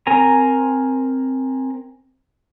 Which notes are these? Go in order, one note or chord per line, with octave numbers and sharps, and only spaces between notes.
C4 A#4 G#5 A#5